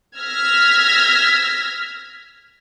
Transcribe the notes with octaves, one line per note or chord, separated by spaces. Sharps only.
E6 F6 G#6 A#6 B6